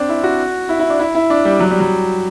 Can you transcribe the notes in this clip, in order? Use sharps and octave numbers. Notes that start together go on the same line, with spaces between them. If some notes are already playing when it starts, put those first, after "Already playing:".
Already playing: C4 D4
E4
F#4
E4
E4
D4
E4
E4
D4
G3
F#3
G3
F#3